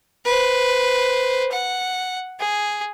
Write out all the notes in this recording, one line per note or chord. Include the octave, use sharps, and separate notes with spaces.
B4 C5
F#5
G#4